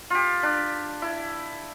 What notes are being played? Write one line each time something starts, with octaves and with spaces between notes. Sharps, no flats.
F4 G4
D4
E4